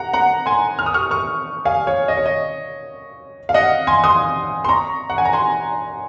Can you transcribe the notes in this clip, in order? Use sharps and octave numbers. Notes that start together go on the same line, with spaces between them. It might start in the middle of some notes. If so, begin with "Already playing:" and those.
Already playing: F#5 A#5
F#5 A#5
G#5 C6
F6
D#6
C#6 F6
C#6 F6
F5 G#5
C#5
D#5
C#5
D#5
F5
D#5 F#5
G#5 C6
C6 D#6
C6
A#5 C#6
F#5
G#5
A#5
G#5 C6